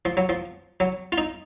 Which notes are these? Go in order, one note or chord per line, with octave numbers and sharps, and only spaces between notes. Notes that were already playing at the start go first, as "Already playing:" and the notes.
F3
F#3
F3
F#3
F4
D#4